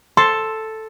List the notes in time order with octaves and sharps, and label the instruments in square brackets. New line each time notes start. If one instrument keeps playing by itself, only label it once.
[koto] A4 [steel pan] C6